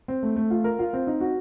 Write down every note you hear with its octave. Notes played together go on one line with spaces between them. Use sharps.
C4
A3
A3
F4
A#4
F4
C4
D#4
F#4